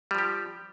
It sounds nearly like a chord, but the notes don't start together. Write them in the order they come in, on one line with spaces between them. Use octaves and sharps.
G3 F3 G4